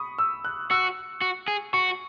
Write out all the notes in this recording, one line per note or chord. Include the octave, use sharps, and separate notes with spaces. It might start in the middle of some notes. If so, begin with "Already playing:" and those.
Already playing: B5 C#6 D#6
E6
F#6
F#4 E6
F#4
G#4
F#4 C#6